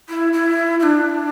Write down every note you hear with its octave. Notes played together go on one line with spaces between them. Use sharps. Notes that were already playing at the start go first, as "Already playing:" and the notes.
E4
E4
E4
D4